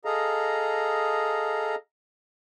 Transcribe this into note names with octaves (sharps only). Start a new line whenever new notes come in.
G#4 A4 D#5 F5 A#5